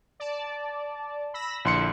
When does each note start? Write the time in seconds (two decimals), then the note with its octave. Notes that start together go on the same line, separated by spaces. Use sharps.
0.20 D5 A5
1.34 B5 E6 A#6
1.65 A#1 D3 E4 C6 C#7